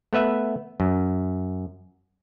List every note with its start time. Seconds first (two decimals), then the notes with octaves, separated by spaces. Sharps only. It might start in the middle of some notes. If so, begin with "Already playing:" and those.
0.13 A3 B3 B4 E5
0.80 F#2